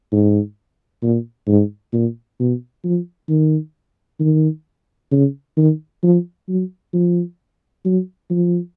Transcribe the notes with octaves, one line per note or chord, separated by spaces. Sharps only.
G#2
A#2
G#2
A#2
B2
F3
D#3
D#3
C#3
D#3
F3
F#3
F3
F#3
F3